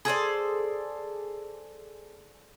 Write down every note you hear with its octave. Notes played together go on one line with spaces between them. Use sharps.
G#4 A4 C5 D5